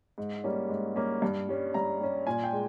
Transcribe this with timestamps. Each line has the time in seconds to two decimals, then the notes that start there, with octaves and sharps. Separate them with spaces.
0.18 G#2
0.44 G3 A#3 C#4
0.69 G#2
0.95 G3 A#3 C#4
1.22 G2
1.49 G3 C#4
1.74 G2 A#5
2.00 G3 C#4
2.27 A#2 G#5
2.44 G5
2.53 G#3